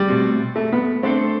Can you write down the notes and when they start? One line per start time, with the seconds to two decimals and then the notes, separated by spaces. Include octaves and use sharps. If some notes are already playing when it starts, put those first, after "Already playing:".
Already playing: G3
0.08 B2 A3 C4 F#4
0.56 A3
0.72 B3
1.03 A3 C4 D4 A4 C5